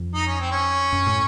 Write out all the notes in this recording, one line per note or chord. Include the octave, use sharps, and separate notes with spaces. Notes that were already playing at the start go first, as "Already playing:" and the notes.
Already playing: F2
D#4
C#4
C4
C#4
F#2
A2